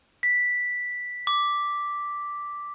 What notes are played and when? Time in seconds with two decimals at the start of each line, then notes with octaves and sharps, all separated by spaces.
0.23 B6
1.27 D6